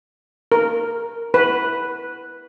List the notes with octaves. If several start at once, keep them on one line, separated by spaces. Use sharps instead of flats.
A#4
B4